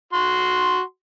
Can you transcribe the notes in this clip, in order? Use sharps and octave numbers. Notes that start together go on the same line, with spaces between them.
F#4 C6